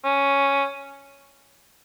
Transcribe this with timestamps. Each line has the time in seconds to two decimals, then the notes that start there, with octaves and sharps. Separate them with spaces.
0.04 C#4